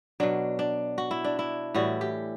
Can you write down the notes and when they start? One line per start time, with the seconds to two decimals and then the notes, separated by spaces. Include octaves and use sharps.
0.20 B2 F#3 D4
0.59 D4
0.98 F#4
1.11 E4
1.24 D4
1.39 E4
1.74 A2 E3 G3 F#4
2.01 G4